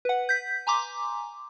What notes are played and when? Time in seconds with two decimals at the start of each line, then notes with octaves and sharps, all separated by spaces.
0.05 B4 F#5
0.29 G6 B6
0.67 G#5 A#5 C6 D6